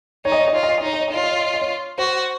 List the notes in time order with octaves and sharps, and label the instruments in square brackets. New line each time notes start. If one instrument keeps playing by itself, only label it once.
[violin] D#4 [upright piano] C#5
[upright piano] D#5
C#5
D#5
[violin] F4 [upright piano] C#5
[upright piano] D#5
C#5
D#5
[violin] D#4 [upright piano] C#5
[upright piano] D#5
C#5
D#5
[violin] F4 [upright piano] C#5
[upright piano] D#5
C#5
D#5
C#5
D#5
C#5
[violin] F#4 [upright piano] C5